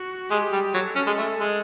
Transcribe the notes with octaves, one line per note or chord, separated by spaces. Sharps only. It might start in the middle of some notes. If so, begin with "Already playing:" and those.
Already playing: F#4
G#3 G4
G3
F#3 A4
C#4
G#3
A3
G#3